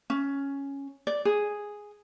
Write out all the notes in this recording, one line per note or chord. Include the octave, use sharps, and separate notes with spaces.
C#4
D5
G#4